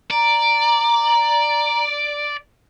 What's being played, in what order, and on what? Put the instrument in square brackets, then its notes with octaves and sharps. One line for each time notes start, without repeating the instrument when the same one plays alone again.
[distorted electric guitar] D5 [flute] A#5